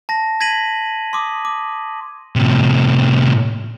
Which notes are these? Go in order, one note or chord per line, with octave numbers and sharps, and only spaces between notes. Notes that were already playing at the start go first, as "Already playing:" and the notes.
A5 A#6
G#6 A#6 B6 D#7 F#7
C6 D6 D#6
D6
A2 C3